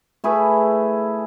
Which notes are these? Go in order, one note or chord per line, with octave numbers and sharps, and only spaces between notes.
A3 E4 G#4 B4